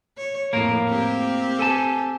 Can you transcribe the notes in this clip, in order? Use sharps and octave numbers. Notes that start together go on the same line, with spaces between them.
C#5
F2 A2 A#3 A#4
C4 G4
A4 G#5 A5